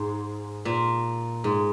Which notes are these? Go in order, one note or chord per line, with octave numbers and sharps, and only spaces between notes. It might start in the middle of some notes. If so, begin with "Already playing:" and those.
Already playing: G#2
A#2
G#2